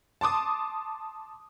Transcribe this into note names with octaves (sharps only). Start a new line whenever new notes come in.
A5 C6 D6 D#6